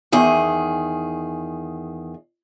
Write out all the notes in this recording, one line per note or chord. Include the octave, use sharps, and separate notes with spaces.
E2 D#3 G#4